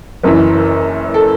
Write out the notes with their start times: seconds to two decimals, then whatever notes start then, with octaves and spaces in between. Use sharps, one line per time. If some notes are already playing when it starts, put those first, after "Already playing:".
0.23 F#1 F#2 E3
1.14 A4